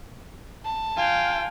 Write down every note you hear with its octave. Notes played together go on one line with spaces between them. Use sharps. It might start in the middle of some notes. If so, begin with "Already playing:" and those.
A5
F4 F5 G5 G#5